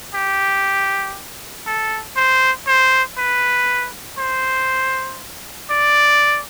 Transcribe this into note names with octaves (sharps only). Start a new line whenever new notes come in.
G4
A4
C5
C5
B4
C5
D5